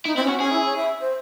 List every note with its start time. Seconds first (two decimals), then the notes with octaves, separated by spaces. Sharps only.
0.06 D#4 E4
0.16 C4 E4
0.23 C#4
0.29 F#4
0.41 C#4 G#4
0.53 E4
0.65 C#5
0.76 E5
1.01 C5